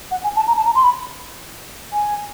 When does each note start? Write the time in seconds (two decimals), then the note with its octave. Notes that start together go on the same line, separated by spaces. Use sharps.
0.11 F#5
0.24 G#5
0.36 A5
0.47 A#5
0.57 A5
0.66 A#5
0.75 C6
0.84 B5
1.93 G#5